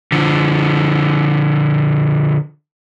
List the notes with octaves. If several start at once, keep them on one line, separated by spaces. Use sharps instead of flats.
D3 F3